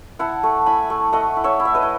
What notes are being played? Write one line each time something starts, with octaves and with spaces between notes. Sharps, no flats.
E4 F#5 A5
A3
E4 G#5 B5
A3
A3 D#5 F#5
E4
C#5 E5
E4
E5
B4 D#5
E4